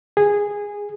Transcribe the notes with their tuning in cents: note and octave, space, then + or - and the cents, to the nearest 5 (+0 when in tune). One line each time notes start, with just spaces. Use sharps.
G#4 -15